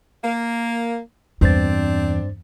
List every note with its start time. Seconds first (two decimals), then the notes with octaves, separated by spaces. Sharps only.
0.23 A#3
1.41 E2 G2 C4 D4 C5 A6